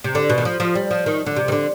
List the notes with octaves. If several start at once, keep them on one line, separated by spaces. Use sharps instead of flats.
C3
D3
B2
D#3
F3
F3
G3
F3
D#3
D3
C3
D#3
D3